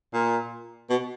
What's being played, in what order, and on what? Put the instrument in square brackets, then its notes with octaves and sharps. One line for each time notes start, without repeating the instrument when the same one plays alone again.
[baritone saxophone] A#2
B2